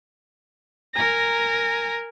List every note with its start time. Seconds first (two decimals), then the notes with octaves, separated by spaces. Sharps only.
0.94 A#4 G#5 A#5 A#6